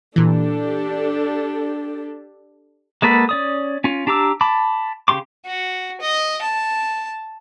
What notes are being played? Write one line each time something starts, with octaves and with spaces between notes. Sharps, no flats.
A#2 E3 D4 G4 A4
G#3 A#3 A4 B4 F#5
C#4 D5 D#6
C#4 F4
D4 G4 A#5 D6 E6
A5 B5 D6
C#3 F3 G4 C6 D6
F#4
D#5
A5